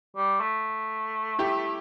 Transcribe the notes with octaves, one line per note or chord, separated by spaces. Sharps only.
G3
A3
E4 G4